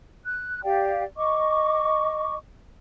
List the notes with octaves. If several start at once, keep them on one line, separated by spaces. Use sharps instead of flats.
F#6
G4 D5 F5 G5
D#5 C#6 D6